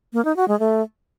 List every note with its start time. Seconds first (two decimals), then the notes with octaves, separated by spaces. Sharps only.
0.13 A#3
0.25 D#4
0.36 F#4
0.48 G#3
0.60 A3